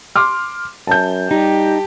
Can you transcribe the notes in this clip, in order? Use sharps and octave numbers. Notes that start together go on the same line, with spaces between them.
C6 D6 F6
F#2 A5 G6
G3 D#4 G4